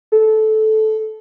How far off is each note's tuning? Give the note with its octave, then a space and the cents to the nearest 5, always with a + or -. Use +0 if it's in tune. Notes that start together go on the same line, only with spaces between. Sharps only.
A4 -15